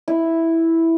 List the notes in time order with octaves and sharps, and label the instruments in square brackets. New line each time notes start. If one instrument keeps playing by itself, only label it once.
[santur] E4